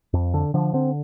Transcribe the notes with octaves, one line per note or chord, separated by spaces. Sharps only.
F2
D3
D3 F3
D3 C4